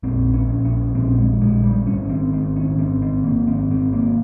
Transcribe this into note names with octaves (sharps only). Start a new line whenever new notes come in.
A#1 C4
C#4
A#1
C#4
A#1 C4
G#3
A#1 G#3
G3
G#1 C#4
C4
G#1 C4
C#4
G#1 C4
C4
G#1 A#3
C4
G#1 C4
A#3